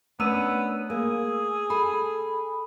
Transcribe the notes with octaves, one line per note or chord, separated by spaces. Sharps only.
A3 B3 C#4 D4 E6 D#7
A#3 G#4
A4 B5